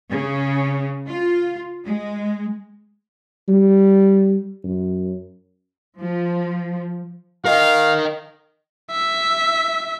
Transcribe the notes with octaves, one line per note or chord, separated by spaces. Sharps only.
C#3
F4
G#3
G3
F#2
F3
A#4 D#5 F5
E5